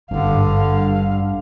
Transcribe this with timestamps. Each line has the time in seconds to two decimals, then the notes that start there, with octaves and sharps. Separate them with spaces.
0.11 G#1 G2 D3 E4 F5